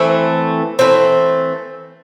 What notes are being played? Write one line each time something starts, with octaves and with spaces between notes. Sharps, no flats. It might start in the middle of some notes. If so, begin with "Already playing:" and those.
Already playing: E3 A3 C4
E3 A3 C4